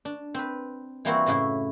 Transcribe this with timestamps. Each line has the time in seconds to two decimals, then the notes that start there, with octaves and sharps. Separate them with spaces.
0.05 D4
0.34 C4 B4
1.05 E3 G3 A#3 C4 E4 F#4
1.26 F#2 A2 C#3 E4 C6